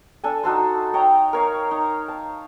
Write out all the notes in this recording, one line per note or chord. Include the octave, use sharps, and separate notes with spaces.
D4 A4 G#5
D#4 F#4 A4 C5
D#4 C#5 G5 A#5
A#4 C#5 F5
D#4
A5